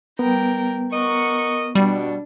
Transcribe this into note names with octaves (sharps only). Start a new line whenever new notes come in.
G3 B3 A#4 G5
A#4 D#5 F#5 C#6
B2 G3 D4